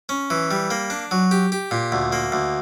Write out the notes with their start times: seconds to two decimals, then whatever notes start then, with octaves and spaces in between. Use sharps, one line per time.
0.09 C#4
0.30 E3
0.51 G3
0.71 A#3
0.90 D4
1.11 F#3
1.31 G4
1.52 G4
1.71 A#2
1.92 D2
2.12 A#3
2.32 D2